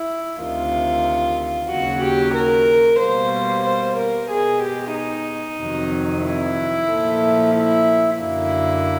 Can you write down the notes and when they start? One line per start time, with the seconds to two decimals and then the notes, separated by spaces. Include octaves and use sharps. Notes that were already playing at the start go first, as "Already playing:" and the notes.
Already playing: E4
0.40 D2 C3 D#3 F4
1.70 D#2 C#3 F#3 F#4
2.04 G4
2.35 A#4
3.00 B2 G3 A#3 C5
3.65 C5
3.98 A#4
4.30 B2 G#3 G#4
4.62 G4
4.94 D#4
5.60 F2 C3 D#3 F#3
6.24 E4
6.89 A#2 F3 A3
7.54 E4
8.19 F#2 D3 F#3 A#3 E4